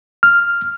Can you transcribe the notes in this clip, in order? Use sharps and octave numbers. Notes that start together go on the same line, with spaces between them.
F6